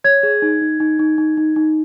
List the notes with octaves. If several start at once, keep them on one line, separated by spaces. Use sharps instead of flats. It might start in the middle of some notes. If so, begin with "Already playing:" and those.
C#5 G#6
G#4
D#4
D#4
D#4
D#4
D#4
D#4
D#4